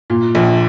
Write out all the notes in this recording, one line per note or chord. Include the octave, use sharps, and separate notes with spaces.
A#2
A#1